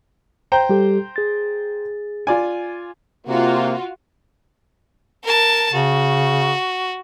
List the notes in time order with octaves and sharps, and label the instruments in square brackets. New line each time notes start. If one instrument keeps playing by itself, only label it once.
[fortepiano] C5 G5 A#5
[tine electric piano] G3 G4 A4
G#4 A6
[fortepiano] F4 D5 G#5
[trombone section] C3 A#3 [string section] F4 F#4
[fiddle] A#4 A5
[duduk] C#3 [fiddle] F#4